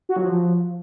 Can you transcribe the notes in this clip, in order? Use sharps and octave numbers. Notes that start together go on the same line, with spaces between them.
F#4
F#3
F3